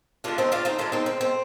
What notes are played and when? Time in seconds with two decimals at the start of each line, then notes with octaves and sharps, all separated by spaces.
0.24 D3 G#3 D4 F4
0.38 C4 D#4
0.52 D4 F4
0.65 C4 D#4
0.78 D3 G#3 D4 F4
0.92 C4 D#4
1.06 C4
1.21 C4